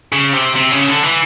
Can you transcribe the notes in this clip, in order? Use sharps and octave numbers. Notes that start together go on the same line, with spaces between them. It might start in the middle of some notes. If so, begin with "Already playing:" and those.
C#3
C3
C3
C#3
D3
E3